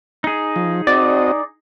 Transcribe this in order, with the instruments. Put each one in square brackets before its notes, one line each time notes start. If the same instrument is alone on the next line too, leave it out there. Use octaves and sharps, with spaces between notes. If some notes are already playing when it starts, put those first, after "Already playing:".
[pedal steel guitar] D#4 G#4
[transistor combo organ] F3
[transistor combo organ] C4 F#4 D#5 [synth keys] D5